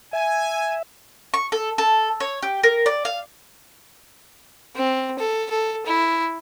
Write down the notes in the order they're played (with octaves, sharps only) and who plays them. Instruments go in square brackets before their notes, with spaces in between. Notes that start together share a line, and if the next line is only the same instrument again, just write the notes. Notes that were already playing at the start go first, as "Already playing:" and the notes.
[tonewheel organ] E5 [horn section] G#5
[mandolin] C#6
A4
A4
C#5
G4
A#4
D5
F5
[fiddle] C4
A4
A4
E4